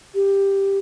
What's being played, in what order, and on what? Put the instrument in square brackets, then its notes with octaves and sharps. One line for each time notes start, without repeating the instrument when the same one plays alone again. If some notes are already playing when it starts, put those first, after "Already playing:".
[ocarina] G4